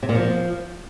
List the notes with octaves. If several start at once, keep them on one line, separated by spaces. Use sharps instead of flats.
C3
A#2
F3